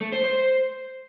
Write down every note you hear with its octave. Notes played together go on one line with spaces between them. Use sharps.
A3
C5
C5